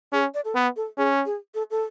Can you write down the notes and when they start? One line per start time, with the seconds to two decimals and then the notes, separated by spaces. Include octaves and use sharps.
0.13 C#4 G#4
0.34 D5
0.45 A4
0.55 B3 B4
0.76 A4
0.98 C#4 G#4
1.26 G#4
1.54 A4
1.71 A4